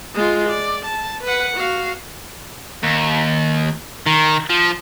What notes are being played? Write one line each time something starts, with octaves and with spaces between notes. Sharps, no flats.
G#3 F4
D5
A5
B4 F#5
F#4 F5
D#2
D#3
F3